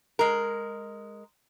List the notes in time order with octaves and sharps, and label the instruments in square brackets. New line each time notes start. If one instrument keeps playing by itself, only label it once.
[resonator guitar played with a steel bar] G#3 A#4